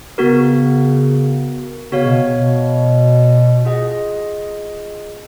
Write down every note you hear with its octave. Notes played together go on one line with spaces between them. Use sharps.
C#3 B3 F#4 A#4
C#3 B3 F#4 C#5 F5
B2
B2
F4 G#4 D#5 F#5